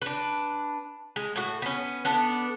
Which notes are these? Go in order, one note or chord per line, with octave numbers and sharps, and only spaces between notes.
D4 B4
G#3
A2 F#4
B3 C#4
B3 D4 A4